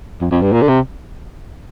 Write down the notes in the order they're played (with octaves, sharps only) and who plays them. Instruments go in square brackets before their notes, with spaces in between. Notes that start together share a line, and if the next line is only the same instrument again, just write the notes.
[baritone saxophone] F2
F2
G2
A#2
D3
C3